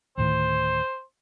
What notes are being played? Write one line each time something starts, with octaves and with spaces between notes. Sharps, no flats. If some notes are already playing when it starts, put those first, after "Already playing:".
D2 A2 D#3 C5